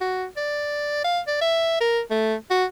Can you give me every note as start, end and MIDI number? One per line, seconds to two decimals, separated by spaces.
0.01 0.26 66
0.36 1.03 74
1.04 1.20 77
1.27 1.38 74
1.41 1.79 76
1.80 2.00 70
2.10 2.34 57
2.50 2.65 66